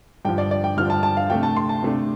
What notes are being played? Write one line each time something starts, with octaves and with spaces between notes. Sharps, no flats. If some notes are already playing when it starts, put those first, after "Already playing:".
G2 D3 F3 G5
D5
D5
G5
G2 D3 F3 F6
A5
A5
F5
C3 A3 D4 G5
A5
C6
A5
C3 A3 D4